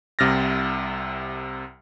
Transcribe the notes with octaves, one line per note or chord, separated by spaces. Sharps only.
C2 C3 F6 A6 A#6